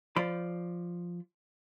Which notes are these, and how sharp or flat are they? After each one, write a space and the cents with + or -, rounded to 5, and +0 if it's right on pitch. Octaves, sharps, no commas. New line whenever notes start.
F3 +0 D5 +0 B5 +35